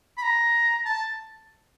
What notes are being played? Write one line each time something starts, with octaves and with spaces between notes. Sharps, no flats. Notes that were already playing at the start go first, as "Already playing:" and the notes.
B5
A#5
A5